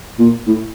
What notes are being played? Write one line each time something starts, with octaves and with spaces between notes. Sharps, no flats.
A#2
A2